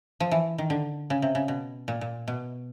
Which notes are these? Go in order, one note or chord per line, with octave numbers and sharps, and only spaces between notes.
F3
E3
D#3
D3
C#3
C3
C#3
B2
A#2
A#2
B2